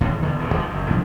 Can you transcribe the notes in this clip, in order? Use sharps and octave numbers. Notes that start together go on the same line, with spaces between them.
E2 A2 D#3
D2 D3 D#3 B3
D#1 E2 C#3
B1 B2 D#3 F3
F#1 F#2
A2 F3 G3 D4